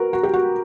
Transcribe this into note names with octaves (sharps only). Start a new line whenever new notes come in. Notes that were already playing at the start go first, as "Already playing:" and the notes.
Already playing: F#4 A#4 B4
F#4
G4
F#4